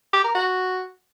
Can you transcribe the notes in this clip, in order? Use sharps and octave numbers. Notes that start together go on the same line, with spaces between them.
G4
A#4
F#4